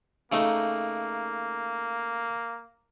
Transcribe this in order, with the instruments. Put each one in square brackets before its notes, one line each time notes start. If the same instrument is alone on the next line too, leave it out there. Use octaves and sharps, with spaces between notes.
[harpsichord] C#3 A3 D#4 [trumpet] A#3